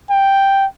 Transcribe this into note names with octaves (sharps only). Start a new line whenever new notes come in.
G5